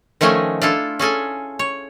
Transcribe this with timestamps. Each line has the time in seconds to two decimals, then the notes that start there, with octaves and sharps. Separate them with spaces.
0.21 D#3 F3 A3 C#4 D#5 G#5
0.62 D4 E4 F4 A4
0.99 C#4 G#4 A4 G#5
1.59 C#5